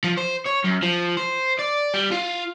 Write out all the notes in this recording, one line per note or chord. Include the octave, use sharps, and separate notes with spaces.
F3
C5
C#5
F#2
F3
C5
D5
G3
F4